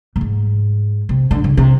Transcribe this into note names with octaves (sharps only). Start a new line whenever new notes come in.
A2
G#2
C3
D3
C#3
C3